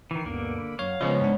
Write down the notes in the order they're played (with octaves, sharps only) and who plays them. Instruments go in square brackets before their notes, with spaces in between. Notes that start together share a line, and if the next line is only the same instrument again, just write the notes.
[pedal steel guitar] D#3 E3 [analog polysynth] C7
[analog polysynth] D2 G2 B2 [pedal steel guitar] D3 A#3
[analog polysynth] B5
[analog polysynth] F#2 F#3 [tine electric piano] C#5 [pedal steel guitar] F5
[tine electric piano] C#3 F3 [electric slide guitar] G#3 C#5 D#5 [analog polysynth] B3 C4
[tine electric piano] G#2 D4